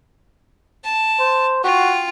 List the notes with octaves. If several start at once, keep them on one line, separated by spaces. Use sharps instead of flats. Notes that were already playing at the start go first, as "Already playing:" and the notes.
A5
C5
F4 F#4 G5